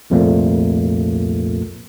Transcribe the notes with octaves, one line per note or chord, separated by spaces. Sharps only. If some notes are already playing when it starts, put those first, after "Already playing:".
C2 F2 A#2 F3 A3 A#3